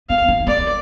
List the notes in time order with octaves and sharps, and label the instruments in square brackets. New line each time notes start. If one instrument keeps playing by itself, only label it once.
[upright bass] B3 [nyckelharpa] F5
[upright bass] B3
[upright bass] B3 [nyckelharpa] D5